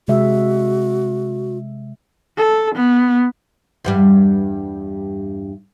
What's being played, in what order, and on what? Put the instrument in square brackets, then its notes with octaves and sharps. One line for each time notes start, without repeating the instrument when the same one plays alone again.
[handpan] C3 G#3 E5 [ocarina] F#4
[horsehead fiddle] A4
B3
[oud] E2 G2 G3